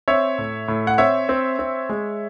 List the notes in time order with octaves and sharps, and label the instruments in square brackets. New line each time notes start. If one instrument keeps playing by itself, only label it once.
[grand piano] C4 C#5 E5
A2
A2
F#5
C4 C#5 E5
C4
C4
G#3